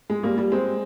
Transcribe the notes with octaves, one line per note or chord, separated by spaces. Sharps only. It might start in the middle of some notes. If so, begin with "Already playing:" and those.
G#3
G3 A#3
G3
G#3 C4